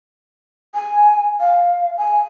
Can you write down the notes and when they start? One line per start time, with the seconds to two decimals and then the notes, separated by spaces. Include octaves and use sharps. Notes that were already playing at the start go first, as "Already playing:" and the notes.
0.75 G#5
1.40 F5
1.98 G#5